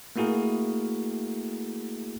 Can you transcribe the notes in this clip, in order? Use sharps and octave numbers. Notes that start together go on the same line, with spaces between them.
A3 A#3 E4 F#4 G#4 A#4